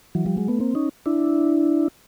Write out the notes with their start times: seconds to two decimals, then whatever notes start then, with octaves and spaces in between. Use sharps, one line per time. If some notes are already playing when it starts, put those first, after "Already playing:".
0.15 E3 F#3
0.26 F3 G3
0.37 F#3 G#3
0.48 A3 B3
0.60 A#3 C4
0.75 C#4 D#4
1.06 D4 E4